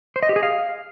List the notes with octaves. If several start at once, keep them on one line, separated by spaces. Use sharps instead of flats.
C5
D#5
G4
G#4
F5